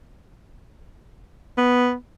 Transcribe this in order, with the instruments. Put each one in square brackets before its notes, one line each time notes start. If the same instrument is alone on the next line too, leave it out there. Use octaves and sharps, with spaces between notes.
[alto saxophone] B3